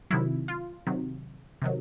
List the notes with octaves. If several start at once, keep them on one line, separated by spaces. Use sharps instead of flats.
C3 D#3 F#3 E4
F4
C3 D#3 F#3
C3 D#3 F#3